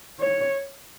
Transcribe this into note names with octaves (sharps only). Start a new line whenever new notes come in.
C#5